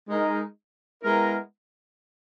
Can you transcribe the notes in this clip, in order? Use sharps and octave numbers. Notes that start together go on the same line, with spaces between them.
G#3 D#4 A#4
G#3 B3 E4 A#4